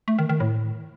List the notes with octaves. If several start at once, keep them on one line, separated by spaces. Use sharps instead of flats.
A3
D#3
D#3
A2